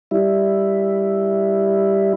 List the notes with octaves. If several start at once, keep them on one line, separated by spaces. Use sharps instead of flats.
G3 E4